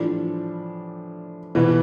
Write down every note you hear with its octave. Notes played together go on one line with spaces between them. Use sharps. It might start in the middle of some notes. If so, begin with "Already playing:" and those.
Already playing: A2 E3 F3 G3 D4
B2 E3 G3 B3